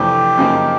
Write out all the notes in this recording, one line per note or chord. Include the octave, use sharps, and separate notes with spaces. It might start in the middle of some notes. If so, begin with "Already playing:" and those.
Already playing: F2 C3 E3 A3 D4 G4
F#2 C#3 F3 A#3 D#4